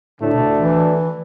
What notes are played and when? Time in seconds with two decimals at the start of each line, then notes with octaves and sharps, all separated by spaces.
0.21 D2 A2 D3 A3 D4
0.33 B2
0.59 E3